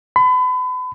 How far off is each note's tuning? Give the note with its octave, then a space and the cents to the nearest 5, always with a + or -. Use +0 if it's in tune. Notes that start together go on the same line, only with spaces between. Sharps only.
B5 +35